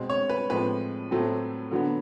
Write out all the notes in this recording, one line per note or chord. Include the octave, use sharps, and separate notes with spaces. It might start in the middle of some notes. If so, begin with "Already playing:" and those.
Already playing: B2 G#3 C4
C#5
B4
A2 F3 G#3 C4 B4
A2 F#3 A3 C4
D3 F#3 B3